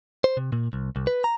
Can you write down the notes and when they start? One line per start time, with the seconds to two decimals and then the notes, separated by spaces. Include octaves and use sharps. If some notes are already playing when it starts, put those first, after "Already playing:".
0.24 C5
0.37 C3
0.52 A#2
0.73 C2
0.96 C2
1.07 B4
1.24 A#5